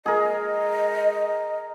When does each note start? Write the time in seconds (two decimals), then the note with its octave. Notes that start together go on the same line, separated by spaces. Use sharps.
0.06 G#3 G#4 A#4 D#5